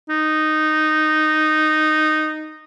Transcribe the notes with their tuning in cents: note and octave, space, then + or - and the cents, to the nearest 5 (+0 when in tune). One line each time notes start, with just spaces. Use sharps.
D#4 -10